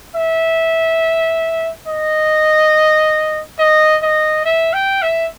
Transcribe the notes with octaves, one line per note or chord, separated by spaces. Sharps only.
E5
D#5
D#5
D#5
E5
G5
E5